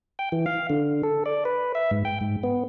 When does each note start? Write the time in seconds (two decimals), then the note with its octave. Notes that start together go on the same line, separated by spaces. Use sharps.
0.19 G5
0.32 E3
0.46 F5
0.70 D3
1.03 A4
1.26 D5
1.45 B4
1.75 E5
1.91 G#2
2.05 G5
2.21 G#2
2.43 B3